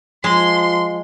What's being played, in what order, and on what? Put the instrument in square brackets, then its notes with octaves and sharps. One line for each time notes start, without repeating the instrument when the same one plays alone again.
[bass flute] F3 [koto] G#3 [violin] C6